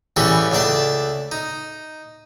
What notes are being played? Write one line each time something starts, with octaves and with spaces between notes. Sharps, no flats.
A1 E3 G3 C#4 G#4 A4
C#2 A3 D4 D5 A5
D#4